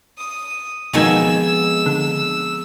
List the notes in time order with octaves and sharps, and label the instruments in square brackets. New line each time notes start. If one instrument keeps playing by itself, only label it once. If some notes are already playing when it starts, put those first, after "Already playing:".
[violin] D#6
[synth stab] B1 D#3 G#6 [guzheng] F2 G#3 B3 [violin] E6
[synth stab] D3